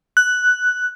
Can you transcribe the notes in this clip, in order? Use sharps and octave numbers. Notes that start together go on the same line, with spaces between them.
F#6